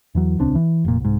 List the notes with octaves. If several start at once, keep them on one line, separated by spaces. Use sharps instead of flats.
E2 E3 F#3
D#1 C#2 C4 D4
E3
F1 A#2
C2 G#2